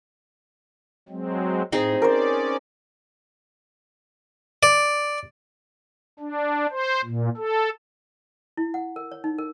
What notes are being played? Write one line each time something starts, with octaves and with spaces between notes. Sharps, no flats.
F#3 G#3 C4
A2 C4 D#4 G#4
C#4 A#4 C5 D5
D5
D4
C5
A#2
A4
E4
F#5
A#4
C#5
D#4
A#4